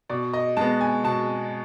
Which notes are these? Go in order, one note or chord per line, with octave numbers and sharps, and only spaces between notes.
B2 D5
D#5
G#3 B3 A5
G#5
B2 A5